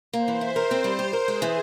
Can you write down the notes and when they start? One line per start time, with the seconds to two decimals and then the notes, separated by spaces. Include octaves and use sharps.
0.13 A#3 C5
0.28 E3
0.41 E4
0.56 A#4
0.71 C4
0.84 G3
0.99 G4
1.13 A#4
1.27 G#3 G#4
1.42 E3